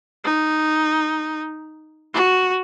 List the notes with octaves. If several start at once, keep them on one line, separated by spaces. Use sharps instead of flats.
D#4
F#4